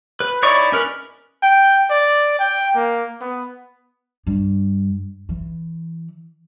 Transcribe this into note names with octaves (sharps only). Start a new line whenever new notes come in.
B4
D#4 E4 C#5 D5 C#6
C#4 A#4 B4
G5
D5
G5
A#3
B3
G2
E3